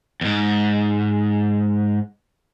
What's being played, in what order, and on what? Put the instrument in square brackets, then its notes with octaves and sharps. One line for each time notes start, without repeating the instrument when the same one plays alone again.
[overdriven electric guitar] E2 G#2